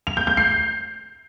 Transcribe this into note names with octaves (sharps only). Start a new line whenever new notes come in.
F7
G6
G6
C7